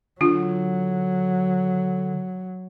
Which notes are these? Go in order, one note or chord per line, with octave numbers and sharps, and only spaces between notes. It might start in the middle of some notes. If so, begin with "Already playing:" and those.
D3 F#3 D4 F4